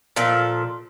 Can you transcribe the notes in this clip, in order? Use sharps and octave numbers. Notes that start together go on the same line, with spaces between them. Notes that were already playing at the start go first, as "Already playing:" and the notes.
A#2 F3 A4